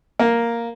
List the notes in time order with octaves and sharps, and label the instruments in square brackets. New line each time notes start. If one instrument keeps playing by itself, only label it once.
[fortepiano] A#3